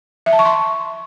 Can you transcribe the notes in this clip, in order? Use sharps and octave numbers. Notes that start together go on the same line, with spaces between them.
E5
A5
C#6
C6